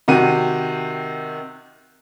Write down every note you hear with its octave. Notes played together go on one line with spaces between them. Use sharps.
C3 D#3 F#4 D#7